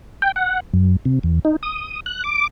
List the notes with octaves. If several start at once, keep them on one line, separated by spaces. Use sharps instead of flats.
G5
F#5
F#2
C3
E2
D#4
D#6
F#6
D6